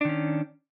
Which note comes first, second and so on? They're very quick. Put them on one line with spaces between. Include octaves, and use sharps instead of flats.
D4 D#3 C#4